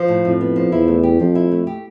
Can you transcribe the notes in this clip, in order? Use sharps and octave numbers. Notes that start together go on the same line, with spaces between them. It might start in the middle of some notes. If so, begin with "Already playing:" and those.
Already playing: F3
A2
F2 A2
B3
F3
E2 E4
A3
G4
F2 F3
E4
A3
G4